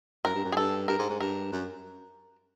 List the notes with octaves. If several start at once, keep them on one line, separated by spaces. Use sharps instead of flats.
F#2 A#4
G2
F#2
G#4
G2 A4
G2 A#4
G#2
G#2
G2 A#4
F#2